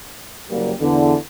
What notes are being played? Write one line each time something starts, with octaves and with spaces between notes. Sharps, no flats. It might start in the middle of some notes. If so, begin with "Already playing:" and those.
F#1 G3 A#3
E2 D3